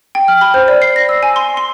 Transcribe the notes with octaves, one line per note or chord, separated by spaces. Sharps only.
G5
F6
B5
C5
D5
C7
A#6
E6
G#5
C6
C6